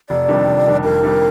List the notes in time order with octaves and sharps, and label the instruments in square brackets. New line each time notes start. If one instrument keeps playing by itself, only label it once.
[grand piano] F1 [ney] D5
[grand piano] F2 D#3 G3 D4
F1
F2 D#3 G3 D4
[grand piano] F1 [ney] A#4
[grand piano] F2 D#3 G3 D4